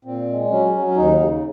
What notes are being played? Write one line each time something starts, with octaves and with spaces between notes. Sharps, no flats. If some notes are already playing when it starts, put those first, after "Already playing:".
A#2 C4
G#3
F#3 C#4
F#3
C#4
D#2 D#4
C#3